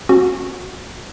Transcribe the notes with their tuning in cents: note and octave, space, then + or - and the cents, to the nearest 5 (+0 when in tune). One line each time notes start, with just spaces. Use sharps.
C#4 -25 F#4 -10